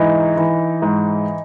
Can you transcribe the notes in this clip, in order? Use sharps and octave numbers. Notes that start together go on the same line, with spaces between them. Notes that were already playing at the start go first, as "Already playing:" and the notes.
Already playing: G#2 E3 D#4
E3
G#2